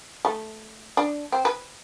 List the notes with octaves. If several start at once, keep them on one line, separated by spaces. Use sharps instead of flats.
A3
D4
C4
B4